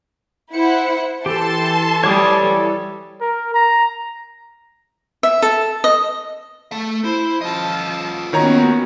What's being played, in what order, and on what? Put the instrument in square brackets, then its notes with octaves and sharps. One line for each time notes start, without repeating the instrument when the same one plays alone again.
[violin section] E4 C5 F#5 [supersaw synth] C#7
[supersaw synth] E3 A4 [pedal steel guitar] G4 [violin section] A5 C6
[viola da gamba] G3 [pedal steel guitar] C#5 D6 D#6
[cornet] A#4
A#5
[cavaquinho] E5
A4
D#5
[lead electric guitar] A3 A5
[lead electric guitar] E4 [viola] C5
[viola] F3 A5 [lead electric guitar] F4 D#5
[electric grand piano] D#3 C#5 A#5 [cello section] A#3 B3 C#4 [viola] F#4